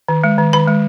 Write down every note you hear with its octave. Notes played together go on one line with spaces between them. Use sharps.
D#3
G#3
D#3
D#3 B5
G#3